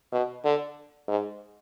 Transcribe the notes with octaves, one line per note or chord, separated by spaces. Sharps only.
B2
D3
G#2